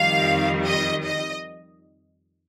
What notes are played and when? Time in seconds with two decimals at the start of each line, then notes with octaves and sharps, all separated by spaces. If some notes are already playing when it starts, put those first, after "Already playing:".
Already playing: F2 D#3 G3 F5
0.66 D#5
1.05 D#5